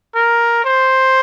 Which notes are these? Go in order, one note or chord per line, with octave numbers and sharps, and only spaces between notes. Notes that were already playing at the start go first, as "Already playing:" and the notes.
A#4
C5